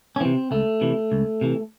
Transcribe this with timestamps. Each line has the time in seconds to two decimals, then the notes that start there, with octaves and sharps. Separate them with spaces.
0.16 C#4
0.20 C3 E3 C4
0.51 C#2 A3
0.81 C3 E3
1.12 C#2
1.41 C3 E3